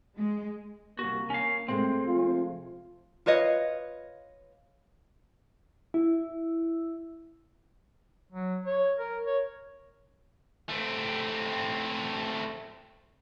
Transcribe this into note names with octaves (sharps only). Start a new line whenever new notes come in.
G#3
C2 A#3 F#4
C#4 F5
C3 G#3 A3 C4
F3 F4
F4 B4 C#5 D#5
E4
F#3
C#5
A#4
C#5
A3 C4